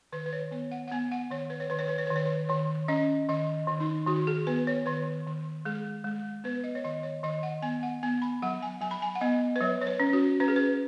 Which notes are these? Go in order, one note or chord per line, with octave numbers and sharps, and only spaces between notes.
D#3 B4
B4
C#5
B3 C#5
F#5
F#5
B3 G#5
F#5
D#3 C#5
B4
C#5
D#3 B4
C#5
B4
C#5
D#3 B4
C#5
B4
D#3 C#5
C#4 D#5
D#3 D#5
D#3
D#4
D#3 F#4
G#4
B3 B4
C#5
D#3 B4
D#3
G#3 G#4
G#3
B3 B4
D#5
C#5
D#3 D#5
C#5
D#3 D#5
F#5
B3 G#5
F#5
B3 G#5
B5
F#3 F#5
G#5
F#3 G#5
B5
G#5
F#5
B3 D#5
B4
F#3 C#5
C#5
B4
C#4
F#4
C#4 B4
G#4
B4